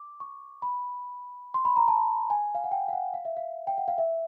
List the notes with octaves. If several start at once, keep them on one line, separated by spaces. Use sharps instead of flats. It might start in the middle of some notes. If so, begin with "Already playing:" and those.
Already playing: D6
C#6
B5
C6
B5
A#5
A5
G#5
F5
F#5
G5
F5
F#5
F5
E5
F5
G5
F#5
F5
E5